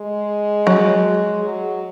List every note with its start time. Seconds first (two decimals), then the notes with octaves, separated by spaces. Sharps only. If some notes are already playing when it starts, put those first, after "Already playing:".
Already playing: G#3
0.67 F#3
1.45 F#3